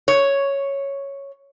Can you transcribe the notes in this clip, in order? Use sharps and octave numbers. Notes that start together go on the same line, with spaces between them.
C#5